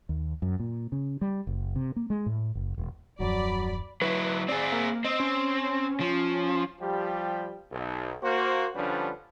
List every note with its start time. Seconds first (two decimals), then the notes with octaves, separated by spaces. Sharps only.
0.09 D#2
0.42 F#2
0.60 A#2
0.92 C#3
1.21 G3
1.47 F#1
1.76 C3
1.96 A#3
2.10 G#3
2.26 A2
2.55 F#1
2.78 E1
3.20 D#1 F#2 F3 F#3 D5 B5
4.01 F#3 E4 B4
4.48 C4 G#4 D5
4.72 A#3
5.05 C4 D#5
5.20 C#4
6.00 F3
6.80 F3 G3 G4
7.72 B1
8.23 A#3 F#4 C5
8.76 D3 F3 G3 C#4 D4 B4